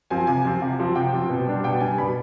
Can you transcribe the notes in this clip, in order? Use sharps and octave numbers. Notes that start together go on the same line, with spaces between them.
F3 C4 F4 G#5
C3 G#5
F3 C4 F4
C3
F3 C4 F4
C3 G5
F3 C4 F4
B2
G3 D4
B2 G5
G3 D4 G#5
B2 B5